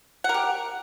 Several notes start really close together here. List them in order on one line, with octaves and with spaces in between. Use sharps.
F#5 A#4 G4